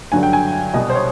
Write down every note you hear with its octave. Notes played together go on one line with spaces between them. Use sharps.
G2 D3 F#3 G#5
G5
G#5
C2 B2 G3 D#5
C5
C#5